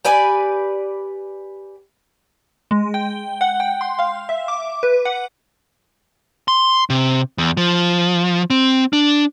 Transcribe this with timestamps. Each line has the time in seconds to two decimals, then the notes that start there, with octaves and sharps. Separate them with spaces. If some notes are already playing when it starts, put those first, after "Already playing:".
0.05 G4 B4 D5 G#5
2.71 G#3
2.94 G5
3.41 F#5
3.60 G5
3.81 C6
3.99 F5
4.29 E5
4.48 D6
4.83 B4
5.05 F#5
6.48 C6
6.90 C3
7.38 E2
7.57 F3
8.50 C4
8.93 D4